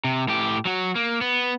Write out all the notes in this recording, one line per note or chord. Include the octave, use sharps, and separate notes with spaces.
C3
A2 G4
F#3 F#4
A#3
B3